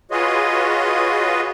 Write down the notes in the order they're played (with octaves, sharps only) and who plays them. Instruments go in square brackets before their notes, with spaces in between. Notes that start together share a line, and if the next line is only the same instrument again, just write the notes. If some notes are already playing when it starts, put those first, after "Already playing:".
[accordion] F4 F#4 G#4 B4 C#5 D#5